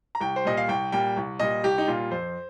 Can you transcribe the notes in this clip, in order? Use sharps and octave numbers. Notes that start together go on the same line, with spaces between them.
A#5
C2 G5
C5
A#2 G3 D#5
F5
C2 G5
A#2 G3 G5
C2
A#2 G3 D#5
C2 G4
D#4
A#2 G3 F4
F2 C5